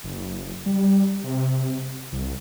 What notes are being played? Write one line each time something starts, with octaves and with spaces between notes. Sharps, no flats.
F#1
G3
C3
C2